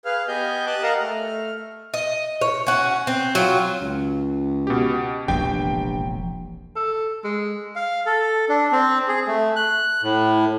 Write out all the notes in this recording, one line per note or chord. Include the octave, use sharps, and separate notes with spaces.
G#4 B4 F5 F6
B3 G4 D#5 G#5 G6
G4 A5 D6 D#6 F#6
A#4 D#5 F5 F#5 A5 A#5
A3 F6
D#5
C#5
C#4 F#4
C4
F#3 F4
C#2
B2 G4
E1 A#1 G2 C3 G5
A4
G#3
F5
A4
D4
C4
G#4
A3
F#6
A2